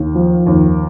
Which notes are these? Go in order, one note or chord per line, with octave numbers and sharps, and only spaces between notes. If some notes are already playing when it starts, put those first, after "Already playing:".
Already playing: D#2
F3
D#2